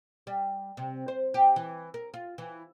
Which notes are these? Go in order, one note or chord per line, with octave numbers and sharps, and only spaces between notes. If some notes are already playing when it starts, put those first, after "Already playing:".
G3
C3
C5
G4
E3
A#4
F4
E3